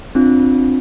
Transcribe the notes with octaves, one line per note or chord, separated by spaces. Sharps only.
C4 D4 F4